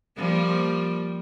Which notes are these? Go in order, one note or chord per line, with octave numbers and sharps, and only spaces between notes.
F3 G3 A#3